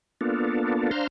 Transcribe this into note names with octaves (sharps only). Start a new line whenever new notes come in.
A#3 B3 D4 F4 A4
D4 C5 F5 A#5 C6